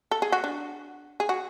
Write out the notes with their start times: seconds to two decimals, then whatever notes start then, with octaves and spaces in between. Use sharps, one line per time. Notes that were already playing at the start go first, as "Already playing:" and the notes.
0.11 A4
0.22 G#4
0.32 F#4
0.44 D4
1.20 G#4
1.29 F#4